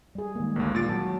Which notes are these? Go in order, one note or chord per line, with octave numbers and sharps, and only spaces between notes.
G3 G#4
D#3 G#3 A#3
A1 D2 A#3
A#2 A6 D7
F#3 F#4 A5